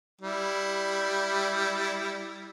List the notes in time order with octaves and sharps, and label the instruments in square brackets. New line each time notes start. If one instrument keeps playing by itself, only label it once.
[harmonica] G3 E4